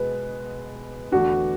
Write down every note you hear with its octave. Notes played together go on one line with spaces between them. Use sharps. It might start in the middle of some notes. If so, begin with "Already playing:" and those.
Already playing: B2 G#3 B3 B4
E2 D3 A3 D4 F#4